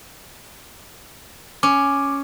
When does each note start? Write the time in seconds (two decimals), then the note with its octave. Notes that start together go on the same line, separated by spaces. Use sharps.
1.63 C#4 D6